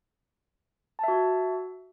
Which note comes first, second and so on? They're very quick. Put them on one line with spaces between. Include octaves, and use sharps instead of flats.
A5 E5 F#4